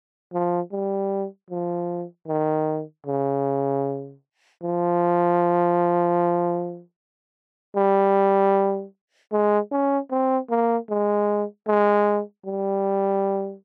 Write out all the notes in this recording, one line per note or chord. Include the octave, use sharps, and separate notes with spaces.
F3
G3
F3
D#3
C#3
F3
G3
G#3
C#4
C4
A#3
G#3
G#3
G3